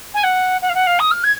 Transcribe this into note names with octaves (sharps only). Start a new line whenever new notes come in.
G#5
F#5
F#5
F5
F#5
F5
D#6
F6
G#6